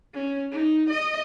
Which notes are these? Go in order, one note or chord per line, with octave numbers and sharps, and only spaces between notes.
C#4
D#4
D#5